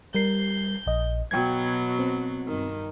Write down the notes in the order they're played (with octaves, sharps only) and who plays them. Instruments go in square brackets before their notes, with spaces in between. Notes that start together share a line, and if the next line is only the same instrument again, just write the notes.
[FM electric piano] G3 A#4 C7 [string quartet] G6
[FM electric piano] A#1 D#5
[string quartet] B2 F#3 [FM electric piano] G5 G#6
[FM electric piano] C4
[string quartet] G2 D#3